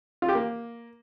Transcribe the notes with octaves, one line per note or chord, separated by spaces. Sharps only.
F4
G4
A#3